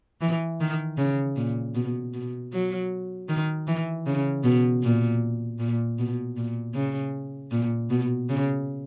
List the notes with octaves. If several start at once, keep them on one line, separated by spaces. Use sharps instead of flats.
E3
D#3
C#3
A#2
B2
B2
F#3
D#3
E3
C#3
B2
A#2
A#2
B2
A#2
C#3
A#2
B2
C#3